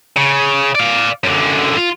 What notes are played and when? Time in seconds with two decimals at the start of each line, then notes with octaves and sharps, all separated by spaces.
0.17 C#3
0.75 D5 F5
1.24 F#2 D3
1.77 F4